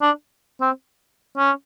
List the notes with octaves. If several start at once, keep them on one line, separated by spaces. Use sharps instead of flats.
D4
C4
C#4